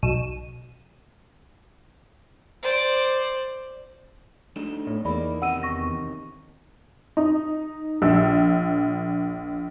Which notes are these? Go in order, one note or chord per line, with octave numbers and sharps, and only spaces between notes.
B1 D#7 E7
C5 D5
A3 D4 D#4
A2
E2 A#3 D#4 D5 B5
C3 D#3 D#4 F#5 E6 D#7
C#6 A#6
D#4
A#1 E6